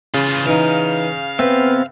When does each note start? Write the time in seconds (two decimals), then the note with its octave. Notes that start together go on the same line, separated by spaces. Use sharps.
0.14 C#3 E3 F4
0.46 E3 D#4 F5
1.39 B3 C4 B4 E5